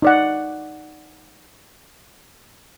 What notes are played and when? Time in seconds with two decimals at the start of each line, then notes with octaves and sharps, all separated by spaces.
0.02 D#4 D5 F#5